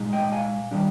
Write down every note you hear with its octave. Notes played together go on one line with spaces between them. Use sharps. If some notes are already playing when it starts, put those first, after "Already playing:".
Already playing: A#2 G#3 D#4
D#5 G5
F5 G#5
D#3 G3 D4